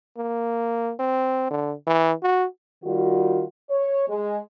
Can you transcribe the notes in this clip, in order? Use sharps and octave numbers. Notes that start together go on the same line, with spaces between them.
A#3
C4
D3
E3
F#4
D#3 G3 F4 F#4
C#5
G#3